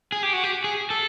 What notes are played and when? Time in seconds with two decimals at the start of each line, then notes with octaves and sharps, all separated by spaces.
0.12 G#4
0.23 G4
0.33 F#4
0.43 G4
0.64 G#4
0.90 A4